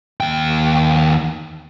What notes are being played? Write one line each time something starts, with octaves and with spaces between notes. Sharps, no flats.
D#2 G5